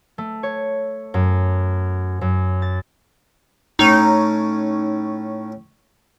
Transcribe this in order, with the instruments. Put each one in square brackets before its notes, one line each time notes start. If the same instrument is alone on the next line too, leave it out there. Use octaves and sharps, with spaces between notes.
[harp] A3
C#5
F#2
F#2
A6
[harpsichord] A2 C#4 [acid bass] D#4